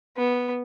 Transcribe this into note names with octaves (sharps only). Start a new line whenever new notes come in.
B3